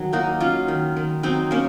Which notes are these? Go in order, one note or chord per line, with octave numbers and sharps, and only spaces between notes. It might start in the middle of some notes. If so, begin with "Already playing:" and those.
Already playing: D#3 F#3
A#3 D#4 F#4
F#3 C#4 F4
D#3
D#3
F#3 C4 D#4
A#3 C#4